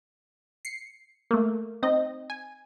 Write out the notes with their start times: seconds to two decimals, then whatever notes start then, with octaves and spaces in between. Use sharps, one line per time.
0.65 C7 C#7
1.31 A3 A#3
1.83 C4 D#4 D#5
2.30 G#5